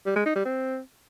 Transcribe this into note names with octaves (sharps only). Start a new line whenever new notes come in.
G3
G#3
D#4
G3
C4